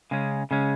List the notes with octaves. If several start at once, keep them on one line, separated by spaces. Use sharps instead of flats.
C#3 G#3 C#4
C#3 G#3 C#4